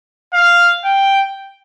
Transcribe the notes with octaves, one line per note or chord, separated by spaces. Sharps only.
F5
G5